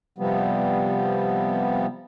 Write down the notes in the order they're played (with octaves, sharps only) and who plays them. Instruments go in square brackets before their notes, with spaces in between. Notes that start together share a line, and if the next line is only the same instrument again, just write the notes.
[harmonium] C3 F3 G3 B3